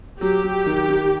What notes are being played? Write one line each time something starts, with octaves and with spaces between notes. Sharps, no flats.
F#3 G4
F#3
D#3
D#3